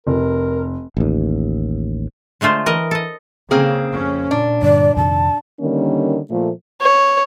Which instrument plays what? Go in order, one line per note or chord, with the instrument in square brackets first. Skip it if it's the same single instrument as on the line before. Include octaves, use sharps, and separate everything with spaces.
[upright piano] F1 [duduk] A#4
[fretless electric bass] A1 D#2
[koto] D3 G#3 A3 F4 C5
E3 A#4 D#5
A4 D#5
[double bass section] C#3 [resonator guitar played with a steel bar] A#3 C4 G#4
[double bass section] F2 C#4
[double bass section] A#2 [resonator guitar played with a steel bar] D4
[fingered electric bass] G2 D3 [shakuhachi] D5
[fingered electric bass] F2 C3 D#3 [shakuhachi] A5
[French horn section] D3 D#3 G3 A#3 C#4
A#2 F3 A3
[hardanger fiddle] C#5